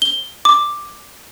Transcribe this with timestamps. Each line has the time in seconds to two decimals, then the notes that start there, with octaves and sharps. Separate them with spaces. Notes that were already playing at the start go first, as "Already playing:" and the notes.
0.02 G7
0.45 D6